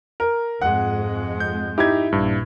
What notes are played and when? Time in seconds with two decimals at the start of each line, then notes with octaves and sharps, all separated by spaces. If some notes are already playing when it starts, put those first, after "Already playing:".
0.20 A#4
0.62 F2 G#2 G#3 F#5
1.40 G6
1.78 D#4 E4 G4 G#6
2.12 A#1 G2